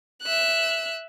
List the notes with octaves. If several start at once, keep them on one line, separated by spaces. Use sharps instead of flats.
E5 F#6